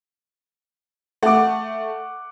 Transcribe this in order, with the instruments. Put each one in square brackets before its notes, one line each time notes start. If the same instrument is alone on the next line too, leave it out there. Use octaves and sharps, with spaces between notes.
[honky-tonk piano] A3 [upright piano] F#5 D6